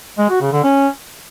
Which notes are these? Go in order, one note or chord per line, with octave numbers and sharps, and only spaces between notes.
G#3
F#4
C#3
D3
C#4